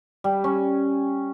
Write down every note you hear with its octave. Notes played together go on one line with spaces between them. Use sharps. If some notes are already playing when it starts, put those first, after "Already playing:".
G3
C#4